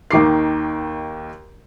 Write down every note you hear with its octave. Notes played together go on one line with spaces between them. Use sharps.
D#2 D#3 D6 C7